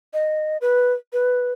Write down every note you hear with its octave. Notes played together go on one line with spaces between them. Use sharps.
D#5
B4
B4